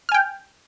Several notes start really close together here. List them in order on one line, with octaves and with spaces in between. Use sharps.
F6 G#5 G5